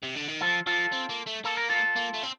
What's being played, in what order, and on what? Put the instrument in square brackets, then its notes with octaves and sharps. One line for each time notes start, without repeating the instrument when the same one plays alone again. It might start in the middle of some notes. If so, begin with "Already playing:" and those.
[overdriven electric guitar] C3
D3
D#3
[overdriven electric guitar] F3 [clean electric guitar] F4 A4
[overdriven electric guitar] F3 [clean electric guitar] F4 A4
[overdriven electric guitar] C4
A#3
A3
[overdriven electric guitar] A#3 [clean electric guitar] A4
[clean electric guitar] A#4
F4 A4
[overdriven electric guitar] A#3
A3
C4